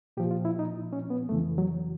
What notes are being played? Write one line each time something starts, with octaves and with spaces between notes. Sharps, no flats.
A#2 F3 G4
F4
E4
D#4
C#4
B3
F2 C#3 E3 A3
F#3